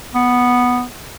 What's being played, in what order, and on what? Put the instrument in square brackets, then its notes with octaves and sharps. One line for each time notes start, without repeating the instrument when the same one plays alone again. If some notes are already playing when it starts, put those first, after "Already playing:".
[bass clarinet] B3